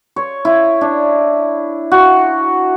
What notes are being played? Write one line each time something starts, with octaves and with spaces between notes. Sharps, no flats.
C#5
E4
D4
F#4